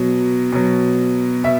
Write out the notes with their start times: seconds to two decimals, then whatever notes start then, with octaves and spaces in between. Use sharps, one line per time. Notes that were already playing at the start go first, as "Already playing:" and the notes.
Already playing: B2 F#3
0.52 B2 F#3
1.44 B2 E5